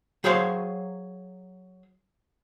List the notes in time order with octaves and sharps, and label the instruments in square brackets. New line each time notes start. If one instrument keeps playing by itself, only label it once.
[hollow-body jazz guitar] F#3 G#4 C5 C#5 F5 C6